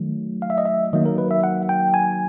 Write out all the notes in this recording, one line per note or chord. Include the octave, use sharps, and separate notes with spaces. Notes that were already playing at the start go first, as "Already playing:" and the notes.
Already playing: D#3 F#3 A3
F5
E5
D#5
E5
D#3 F#3 A#3 D#5
A#4
B4
E5
F#5
G5
G#5